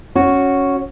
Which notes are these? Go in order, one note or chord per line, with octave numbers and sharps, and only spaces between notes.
C#4 F#4